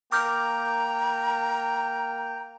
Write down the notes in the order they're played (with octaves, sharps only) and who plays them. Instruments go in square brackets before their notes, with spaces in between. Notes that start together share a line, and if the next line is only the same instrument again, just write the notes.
[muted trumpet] A#3 [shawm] G5 [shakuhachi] A#5 [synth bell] D6 F6 G6